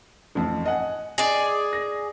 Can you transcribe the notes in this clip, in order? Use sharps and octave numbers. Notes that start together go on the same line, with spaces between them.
A1 F2 A2
D#5 F#5 G#5
G#4 D5 D#5
A#6